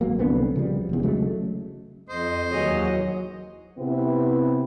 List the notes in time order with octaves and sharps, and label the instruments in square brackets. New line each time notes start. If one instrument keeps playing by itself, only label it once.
[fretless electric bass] G#1 F#3 A#3
C2 D3 B3 C4
C#3 F3 G3
F1 E2
C#3 F#3 G#3 A3
[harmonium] F2 D#5 [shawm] C5
[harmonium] D#2 G#4 C#5 [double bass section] E3 F#3 [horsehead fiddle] F#4 D#5
[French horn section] C3 B3 C4 E4 B4